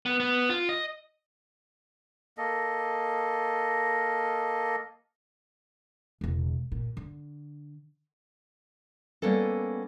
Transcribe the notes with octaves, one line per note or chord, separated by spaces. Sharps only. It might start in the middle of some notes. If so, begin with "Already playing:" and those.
B3
B3
F4
D#5
A#3 A4 D#5
E1 C#2
A#2
D3
G3 A#3 B3 C#4 A4